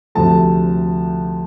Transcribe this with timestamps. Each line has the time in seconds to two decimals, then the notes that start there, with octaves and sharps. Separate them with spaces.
0.15 D2 C3 F3 A3 A5